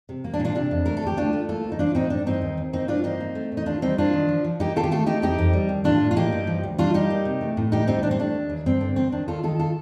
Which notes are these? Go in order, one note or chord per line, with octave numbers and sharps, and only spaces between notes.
C3
A#3
D4
A#2
D4 F4
C3 D4
F2
A3 A#4
A4
D2 G4
A3 D4 F4
A3
A#3 F4 A4
D2
D#4
F3 D4 F4
A2 C4 D#4
G2 D4
G2 C4 D#4
D#2
D#2
A#3 C4 D#4
G2 D4 F4
A#3 C4 D#4
A#3
A3
A#2
D#4
D#2 D4 F4
G3 C4 D#4
A#3 D4 F4
D#3
F3
F3
A#3 D#4 G4
D#3 F4 A4
G4
A3 F4 A4
A3 D#4 G4
F2 D#4 G4
F2
G3
D#2
A2 D4 F4
A2
F4
A#3 D#4 G4
G2
F3
D2
G3 D4 F4
G3 D#4 G4
A#3
C3
A3
A2
D2 D#4 G4
G3 C4 D#4
A2 D4
C4
A3 D4
D#2
D#2
G2 C4
D3
D#2 C4
D#3 D4
D#2 F4 A4
D#3 F4 A4
F4 A4